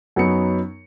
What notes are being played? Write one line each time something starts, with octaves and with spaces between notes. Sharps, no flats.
F#2 F#3 B3 D#4 C#7